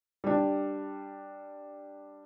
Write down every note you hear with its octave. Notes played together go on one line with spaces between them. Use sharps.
G3 D4